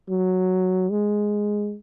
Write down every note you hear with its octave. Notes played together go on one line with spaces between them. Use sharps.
F#3
G#3